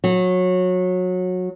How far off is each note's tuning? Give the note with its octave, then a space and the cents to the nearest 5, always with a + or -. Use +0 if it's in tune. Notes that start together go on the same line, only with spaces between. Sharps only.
F#3 -20